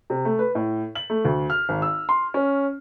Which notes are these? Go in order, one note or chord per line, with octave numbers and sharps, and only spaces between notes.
C3
A3
B4
A2
F#7
A3
D2
F6
G#1
E6
C6
C#4